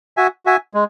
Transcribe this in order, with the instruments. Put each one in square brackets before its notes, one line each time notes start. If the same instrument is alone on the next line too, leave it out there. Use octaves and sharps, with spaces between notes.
[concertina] F#4 E5 G#5
F#4 E5 G#5
G#3